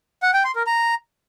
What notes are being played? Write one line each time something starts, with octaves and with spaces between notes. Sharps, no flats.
F#5
G5
C6
A#4
A#5